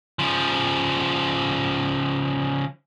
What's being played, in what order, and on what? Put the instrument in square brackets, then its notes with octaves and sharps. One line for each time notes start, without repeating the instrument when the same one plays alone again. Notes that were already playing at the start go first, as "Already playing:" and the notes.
[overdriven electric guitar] C#3 F3